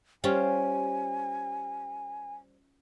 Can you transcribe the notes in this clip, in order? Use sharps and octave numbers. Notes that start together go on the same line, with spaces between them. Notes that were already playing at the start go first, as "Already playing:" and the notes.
G3 C#4 F4 G4 C5 G#5